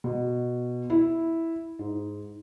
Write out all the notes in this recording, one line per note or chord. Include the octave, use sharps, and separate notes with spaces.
B2
E4
G#2